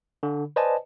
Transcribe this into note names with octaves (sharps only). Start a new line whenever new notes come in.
D3
B4 C5 D5 D#5 G#5 A5